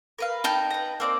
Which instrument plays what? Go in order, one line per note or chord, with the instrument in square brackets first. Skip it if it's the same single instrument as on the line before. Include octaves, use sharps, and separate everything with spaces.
[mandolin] A#4 B4 F5
[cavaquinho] D#4 G5 A5
[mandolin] B4 A#5
A#3 C4 D5